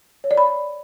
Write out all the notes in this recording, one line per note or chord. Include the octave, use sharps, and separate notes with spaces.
C#5
D5
B5